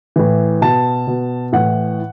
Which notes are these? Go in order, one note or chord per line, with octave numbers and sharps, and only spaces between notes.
A2 E3
B2 A5
B2
A2 E3 F#5